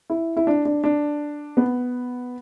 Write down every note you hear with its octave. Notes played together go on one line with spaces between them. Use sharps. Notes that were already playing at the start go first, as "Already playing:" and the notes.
E4
E4
D4
D4
D4
B3